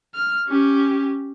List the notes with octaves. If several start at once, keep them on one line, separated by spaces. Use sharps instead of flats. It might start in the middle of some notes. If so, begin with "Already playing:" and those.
F6
C#4 G4